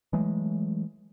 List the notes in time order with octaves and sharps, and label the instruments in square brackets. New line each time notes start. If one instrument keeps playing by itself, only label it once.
[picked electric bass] E3 F#3 G#3 A3